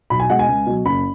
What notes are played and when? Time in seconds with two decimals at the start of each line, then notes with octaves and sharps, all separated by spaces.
0.10 B1 B5
0.20 G#5
0.29 B2 G#3 F#5
0.39 G#5
0.48 C#2
0.66 B2 F#3
0.85 F#1 B5